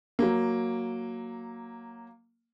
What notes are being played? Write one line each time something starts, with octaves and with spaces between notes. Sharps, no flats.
F#3 A#3